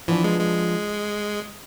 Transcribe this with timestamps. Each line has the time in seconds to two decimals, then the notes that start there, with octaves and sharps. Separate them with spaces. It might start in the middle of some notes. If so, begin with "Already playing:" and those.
0.08 E3 F3 B3 D4
0.24 G#3
0.40 G#3